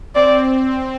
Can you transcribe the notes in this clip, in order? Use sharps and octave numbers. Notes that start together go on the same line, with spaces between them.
C4 D5